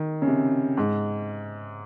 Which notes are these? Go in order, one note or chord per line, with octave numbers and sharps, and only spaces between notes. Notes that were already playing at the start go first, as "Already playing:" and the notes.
Already playing: D#3
C#3
C3
G#2